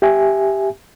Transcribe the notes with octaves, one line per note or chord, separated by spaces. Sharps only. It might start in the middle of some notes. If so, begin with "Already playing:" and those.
G4 E5 G#5